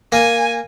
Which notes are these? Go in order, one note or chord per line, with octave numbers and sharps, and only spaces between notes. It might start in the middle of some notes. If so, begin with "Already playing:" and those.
A#3 G#5